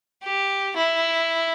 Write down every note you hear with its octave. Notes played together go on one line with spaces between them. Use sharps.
G4
E4